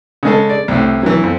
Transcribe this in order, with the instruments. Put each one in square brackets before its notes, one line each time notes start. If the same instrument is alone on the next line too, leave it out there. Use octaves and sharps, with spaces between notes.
[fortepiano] C#3 G#3 A4
D5
C2 A2
E3 F#3
F2